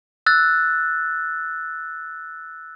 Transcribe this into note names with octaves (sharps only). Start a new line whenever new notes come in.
E6 F#6 A6